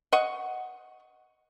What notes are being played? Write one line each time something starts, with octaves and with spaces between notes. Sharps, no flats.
D#5 F#5 C#6